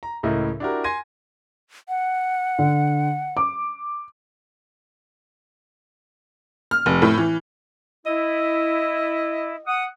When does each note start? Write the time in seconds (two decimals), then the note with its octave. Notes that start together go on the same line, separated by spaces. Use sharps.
0.03 A#5
0.23 C#2 A2 E4 A#4 D#5
0.60 D4 E4 F#4 G4 A#4
0.84 G#5 C6 G#6 A#6 D#7
1.89 F#5
2.59 D3
3.37 D6
6.71 F6
6.86 F1
7.02 A2
7.17 E3
8.06 E4 D#5
9.66 F#5 D#6